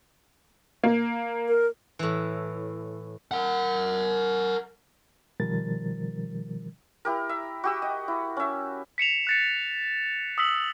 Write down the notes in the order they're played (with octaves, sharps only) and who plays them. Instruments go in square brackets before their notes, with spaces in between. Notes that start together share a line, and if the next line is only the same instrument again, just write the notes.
[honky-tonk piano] A#3
[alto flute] A#4
[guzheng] A2 E3
[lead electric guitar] A#4 F#5
[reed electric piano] B2 D#3 F3 G3 A#4 A6
[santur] E4 G4 A#4
E5
F#4 G4 E6
D#5
E4
C#4 E5
[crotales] B6 C#7 E7 F7
F#6 A6 C#7
D#6 E6 B6 F#7